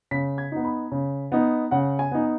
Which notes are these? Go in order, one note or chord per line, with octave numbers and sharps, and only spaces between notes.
C#3 B6
G#6
B3 D#4
B5
C#3
B3 D#4
C#3 F#5
G#5
B3 D#4